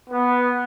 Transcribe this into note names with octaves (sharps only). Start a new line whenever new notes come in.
B3